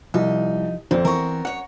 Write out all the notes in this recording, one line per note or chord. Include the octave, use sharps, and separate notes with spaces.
C2 F3 D#4
F2 A#2 C4
E3 B3 A#4 A#5 C#6
F#2 C#5 F#5